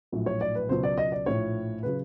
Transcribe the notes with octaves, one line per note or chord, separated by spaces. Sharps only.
A#1 A2 F#3
C#5
D5
B4
C#2 B2 F#3 C5
D5
D#5
D5
A#1 A2 F3 C#5
C#3 F#3 B4